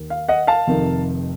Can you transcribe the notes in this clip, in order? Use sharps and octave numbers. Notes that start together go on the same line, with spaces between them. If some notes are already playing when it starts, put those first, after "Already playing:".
Already playing: D#2 D#3
F5
D#5 F#5
F5 A5
F1 F2 C3 D#3